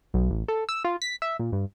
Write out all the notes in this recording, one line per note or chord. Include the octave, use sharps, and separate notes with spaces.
B1
A1
A4
E6
F4
B6
E5
A#2
G2